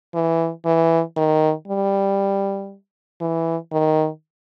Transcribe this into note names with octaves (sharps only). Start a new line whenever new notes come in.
E3
E3
D#3
G3
E3
D#3